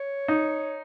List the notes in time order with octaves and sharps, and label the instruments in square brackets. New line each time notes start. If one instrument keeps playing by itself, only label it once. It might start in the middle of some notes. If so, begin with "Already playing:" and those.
Already playing: [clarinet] C#5
[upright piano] D#4